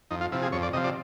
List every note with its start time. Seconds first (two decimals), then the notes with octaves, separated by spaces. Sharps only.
0.11 F2 D#4
0.21 F4
0.32 C3 F3 E4
0.42 G#4
0.52 F2 C#5
0.63 D5
0.73 C3 F3 D#5
0.84 D5